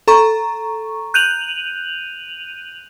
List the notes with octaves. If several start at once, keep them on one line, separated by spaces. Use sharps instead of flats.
A4 A#5 C#6
F#6 G6 D#7 F7 F#7